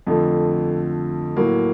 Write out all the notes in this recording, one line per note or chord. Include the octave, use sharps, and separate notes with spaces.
F2 D3 F3 A3
A2 F#3 A#3